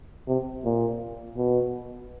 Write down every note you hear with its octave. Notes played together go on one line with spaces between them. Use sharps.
C3
A#2
B2